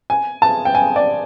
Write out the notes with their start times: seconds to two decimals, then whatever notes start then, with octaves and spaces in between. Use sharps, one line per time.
0.10 G#5
0.42 A5
0.65 G5
0.75 G#5
0.96 D5